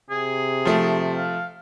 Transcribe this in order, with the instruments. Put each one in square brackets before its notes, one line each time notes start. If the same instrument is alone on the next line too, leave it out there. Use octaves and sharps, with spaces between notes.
[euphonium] C3 [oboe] G#4
[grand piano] F3 A3
[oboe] F5